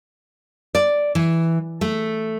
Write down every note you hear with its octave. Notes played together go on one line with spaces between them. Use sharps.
D5
E3
A3